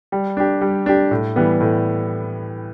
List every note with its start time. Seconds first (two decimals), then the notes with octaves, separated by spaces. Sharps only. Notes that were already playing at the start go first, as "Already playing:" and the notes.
0.12 G3
0.37 D4 G4
0.61 G3
0.86 D4 G4
1.11 A2
1.36 E3 G3 B3
1.60 A2